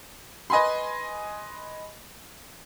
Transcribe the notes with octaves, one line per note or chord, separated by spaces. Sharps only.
B4 D#5 G#5 B5 C6